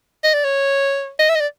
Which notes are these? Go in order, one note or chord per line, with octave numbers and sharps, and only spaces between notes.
D#5
D5
C#5
D#5
E5
D#5
D5